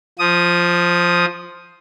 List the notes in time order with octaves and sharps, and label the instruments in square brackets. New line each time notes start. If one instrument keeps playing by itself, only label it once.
[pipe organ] F3 D#6